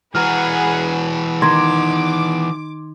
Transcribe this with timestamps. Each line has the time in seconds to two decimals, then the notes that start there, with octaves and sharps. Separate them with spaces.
0.15 E3 F#4 G#4 B4 F#5 A#5 F6
1.42 D#3 C6 D6 G#6